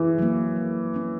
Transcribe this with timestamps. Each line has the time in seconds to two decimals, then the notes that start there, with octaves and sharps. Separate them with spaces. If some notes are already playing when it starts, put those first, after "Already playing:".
Already playing: E3
0.19 F#3 A#3
0.56 F3
0.94 A#3 C#4